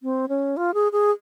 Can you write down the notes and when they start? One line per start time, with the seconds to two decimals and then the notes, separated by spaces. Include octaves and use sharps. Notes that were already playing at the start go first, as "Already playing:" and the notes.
0.03 C4
0.29 C#4
0.57 F4
0.74 G#4
0.92 G#4